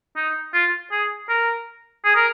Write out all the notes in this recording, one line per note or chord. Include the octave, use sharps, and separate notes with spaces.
D#4
F4
G#4
A#4
G#4
A#4